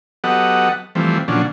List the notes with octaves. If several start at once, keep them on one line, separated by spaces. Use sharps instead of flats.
F#3 B3 G4 A4 D#5 F#5
E3 F3 G3 A3 C4
A#2 D3 F3 F#3 C#4 D4